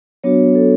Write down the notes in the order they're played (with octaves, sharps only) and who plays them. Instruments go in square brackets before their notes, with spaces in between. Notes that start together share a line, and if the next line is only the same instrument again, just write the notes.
[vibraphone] F#3 B3 D4 F#4 C#5
A4